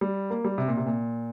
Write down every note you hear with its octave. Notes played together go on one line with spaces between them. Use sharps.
G3
A#3
G3
C3
A#2
C3
A#2